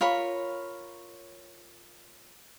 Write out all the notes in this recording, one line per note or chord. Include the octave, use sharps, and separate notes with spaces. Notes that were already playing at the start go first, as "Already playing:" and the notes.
F4 A#4 C#5 B5